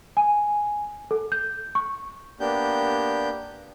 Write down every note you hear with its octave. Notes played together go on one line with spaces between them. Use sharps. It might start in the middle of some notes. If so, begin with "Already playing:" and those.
G#5
A4
G6
C#6
A#3 B3 D4 G4 G6